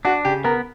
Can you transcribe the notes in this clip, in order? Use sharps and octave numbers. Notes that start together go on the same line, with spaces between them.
D4 F#4
C#3 G4
B3 A#4